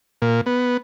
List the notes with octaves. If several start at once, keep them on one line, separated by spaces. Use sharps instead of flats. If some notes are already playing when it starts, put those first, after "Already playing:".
A#2
B3